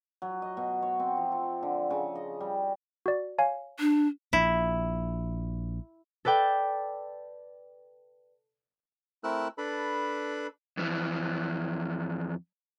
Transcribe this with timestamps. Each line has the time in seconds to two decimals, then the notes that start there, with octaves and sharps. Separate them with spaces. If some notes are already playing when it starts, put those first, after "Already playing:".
0.22 F#3
0.42 D#5
0.57 B2
0.82 C#5
1.00 C4
1.17 F3
1.32 A4
1.62 D3
1.90 C#3
2.15 D#5
2.40 G3
3.06 F#4 D5
3.38 C#5 F5 G#5
3.80 D4
4.33 A#1 E4
6.25 A4 B4 D5 G5
9.24 A3 C4 E4 A#4 E6 F#6
9.58 D4 A4 B4 B5
10.77 F2 E3